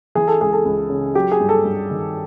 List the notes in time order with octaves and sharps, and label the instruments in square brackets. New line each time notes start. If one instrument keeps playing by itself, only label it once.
[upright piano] E3 G#4
A4
C#2 G#4
A4
C#2
C#3
F#3 G4
G#4
G2
A4
G2
D#3